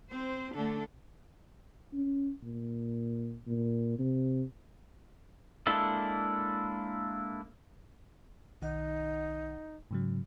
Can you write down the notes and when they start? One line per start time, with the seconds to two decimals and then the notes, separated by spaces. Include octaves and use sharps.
0.11 C4 C5
0.55 D3 A3 D4 A4
1.93 C#4
2.43 A#2
3.47 A#2
3.99 C3
5.67 G#3 A#3 D4 E4 A4
8.62 B1 D#3 D#4 F#5
9.91 G#2 C#3 F#3